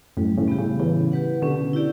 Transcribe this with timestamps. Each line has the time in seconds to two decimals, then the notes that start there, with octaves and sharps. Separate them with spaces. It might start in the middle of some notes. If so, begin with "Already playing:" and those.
0.17 F#2 A2 G3
0.37 A2 C#3
0.48 B3 E4 G4 C#5
0.58 A2 C#3
0.79 C#3 E3 E4
1.12 G4 B4 F#5
1.42 B2 D3 C#4
1.73 E4 G4 D5